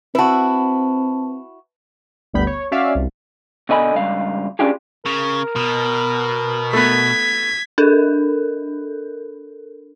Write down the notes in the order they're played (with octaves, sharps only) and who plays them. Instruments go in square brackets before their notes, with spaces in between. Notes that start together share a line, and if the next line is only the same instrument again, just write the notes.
[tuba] C4 [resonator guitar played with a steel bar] E4 F#4 [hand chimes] B4 A5
[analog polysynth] G1 D2 G3 B3 B5 G6
C#5
C#4 F#4 D5 E5 F5
C2
[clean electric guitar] B2 D3 D#5 G#5 B5
C#2 G2 F5
C#4 D4 F4 G4 G#4
[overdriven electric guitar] C#3 [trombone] A#4
[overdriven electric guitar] B2
[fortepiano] A3 B3 [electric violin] G#6 B6
[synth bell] D4 A4 A#4